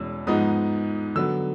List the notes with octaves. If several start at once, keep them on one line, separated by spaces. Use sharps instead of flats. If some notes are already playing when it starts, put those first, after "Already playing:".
Already playing: E2 B2 G#3 C#4 E6
G#2 F3 G#3 B3 D#4 D#6
D3 F#3 B3 E6